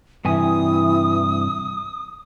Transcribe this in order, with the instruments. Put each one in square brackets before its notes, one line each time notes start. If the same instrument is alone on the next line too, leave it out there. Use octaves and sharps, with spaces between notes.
[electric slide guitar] G2 C3 G#5 [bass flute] E3 [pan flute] D#6